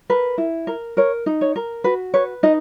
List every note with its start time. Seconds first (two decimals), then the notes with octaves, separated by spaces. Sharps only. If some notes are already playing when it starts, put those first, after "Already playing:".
0.10 A#4 B4
0.38 E4
0.67 A#4
0.97 A#4 C#5
1.26 D#4
1.41 C#5
1.56 A#4
1.84 F#4 B4
2.14 B4 C#5
2.43 D#4 D#5